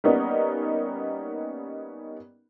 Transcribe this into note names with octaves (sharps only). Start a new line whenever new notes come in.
G3 A#3 B3 C#4 D#4 A#4